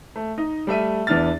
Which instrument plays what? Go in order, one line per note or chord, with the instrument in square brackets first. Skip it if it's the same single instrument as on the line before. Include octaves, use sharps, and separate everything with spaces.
[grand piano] A3
D#4
G3 A3 E5 D#7
E2 B3 D4 E4 F6 A6